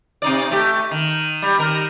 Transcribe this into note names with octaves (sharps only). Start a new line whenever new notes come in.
C3 D#4 D5
A3 G4
D#3
G3
D#3 A#4